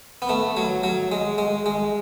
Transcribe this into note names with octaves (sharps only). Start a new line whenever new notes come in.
B3
A3
F#3
F#3
G#3
G#3
G#3